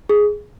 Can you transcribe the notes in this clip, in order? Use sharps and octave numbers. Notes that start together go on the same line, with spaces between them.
G#4